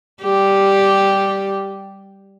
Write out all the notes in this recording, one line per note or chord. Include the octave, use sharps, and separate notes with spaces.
G3 G4